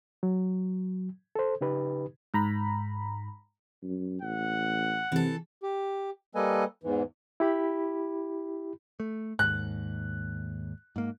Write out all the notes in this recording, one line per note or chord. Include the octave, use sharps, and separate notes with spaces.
F#3
A4 C5
C#3 D#4 G4 B4
G#2 A#5 B5
F#2
A1 F#5
C3 E3 A4
G4
G3 A#3 A4 B4 D#5 G#5
E2 G#2 E3
E4 G4 B5
A3
D#2 G#2 F#6
G#2 A#3